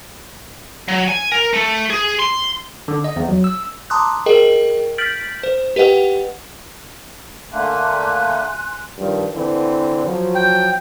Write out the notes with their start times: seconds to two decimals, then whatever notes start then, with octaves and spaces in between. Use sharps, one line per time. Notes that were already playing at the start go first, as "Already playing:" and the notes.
0.88 F#3
1.08 G#5
1.32 A#4
1.53 A3
1.90 G#4
2.19 C6
2.88 D3
3.04 D#5
3.16 E2
3.28 F#3
3.44 E6
3.90 A5 A#5 C6 D6 D#6 F#6
4.26 G#4 A#4 D#5 G5
4.98 F6 G6 A6 B6 D7 F#7
5.43 C5
5.76 G4 B4 D#5 F#5 G5
7.52 D3 A3 A#3 G#5 C6 F#6
8.98 G2 D#3 F3
9.33 D3 E3 C4
10.05 F3 F#3
10.35 G5